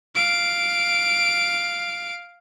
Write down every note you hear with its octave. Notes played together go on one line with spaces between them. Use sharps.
F5 D7